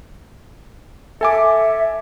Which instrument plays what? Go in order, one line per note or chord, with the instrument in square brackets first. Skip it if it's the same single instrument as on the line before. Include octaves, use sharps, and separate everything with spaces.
[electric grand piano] A4 G#5 D6 [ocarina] E5